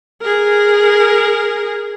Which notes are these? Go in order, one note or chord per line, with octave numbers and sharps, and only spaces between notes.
G#4 A#4